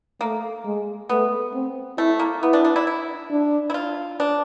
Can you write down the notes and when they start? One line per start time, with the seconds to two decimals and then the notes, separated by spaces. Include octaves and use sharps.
0.21 A3 A#3
0.65 G#3
1.09 A3 B3
1.53 C4
1.98 A3 E4
2.19 A#3
2.42 B3 E4
2.53 D4
2.64 D4
2.76 E4
2.87 E4
3.31 D4
3.70 E4
3.74 F4
4.20 D4